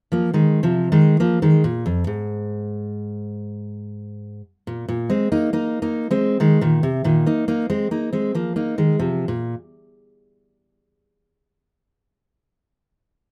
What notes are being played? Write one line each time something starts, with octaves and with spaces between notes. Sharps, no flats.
F3 A#3
D#3 G#3
C3 F3
D#3 G#3
F3 A#3
D#3 G#3
A#2
F2
G#2
A#2
A#2
G#3 C4
A#3 D#4
A#3 D#4
A#3 D#4
G#3 C4
D#3 G#3
A#2 D#3
C3
A#2 D#3
A#3 D#4
A#3 D#4
G#3 C4
A#3 D#4
G#3 C4
F3 A#3
A#3 D#4
D#3 G#3
C3 F3
A#2